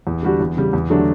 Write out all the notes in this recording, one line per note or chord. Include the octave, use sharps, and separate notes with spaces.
E2
D3 G3 D4 F#4
E2
C#3 G3
E2
D3 F#3 A3 D4